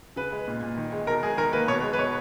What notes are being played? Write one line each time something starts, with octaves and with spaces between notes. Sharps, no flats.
C#3 B4
G#3
A#2
A#2
D#3
G#3
B2 A#4
G#3 G#4
D#3 A#4
A#3 B4
B2 C#5
G#3
B4
B2 C#5